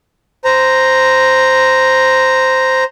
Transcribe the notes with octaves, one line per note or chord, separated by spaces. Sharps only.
C5 A#5